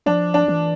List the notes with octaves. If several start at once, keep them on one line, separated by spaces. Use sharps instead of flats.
F3 D4
D4
E3